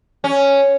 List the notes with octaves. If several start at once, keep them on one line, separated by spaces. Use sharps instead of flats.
C#4